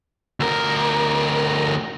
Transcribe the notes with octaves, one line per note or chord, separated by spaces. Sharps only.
D2 A#4